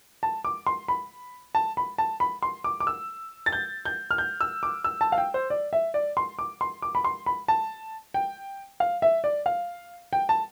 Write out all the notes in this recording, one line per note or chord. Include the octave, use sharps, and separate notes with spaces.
A5
D6
C6
B5
A5
B5
A5
B5
C6
D6
D6
E6
A6
G6
G6
F6
G6
E6
D6
E6
A5
F5
G5
C5
D5
E5
D5
C6
D6
C6
D6
B5
C6
B5
A5
G5
F5
E5
D5
F5
G5
A5